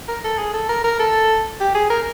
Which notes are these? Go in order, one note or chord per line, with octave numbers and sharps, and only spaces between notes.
A#4
A4
G#4
A4
A#4
A#4
A4
G4
G#4
A#4